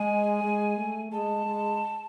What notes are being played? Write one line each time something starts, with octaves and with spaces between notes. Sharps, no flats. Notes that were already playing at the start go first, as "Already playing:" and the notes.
Already playing: G#3 G#5
G#3
A3
G#3 A5
G#3